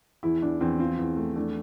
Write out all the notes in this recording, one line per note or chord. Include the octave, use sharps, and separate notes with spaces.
E2 E4
E2 D4
E2 C4
F3 C4
E2
A3
A3 D4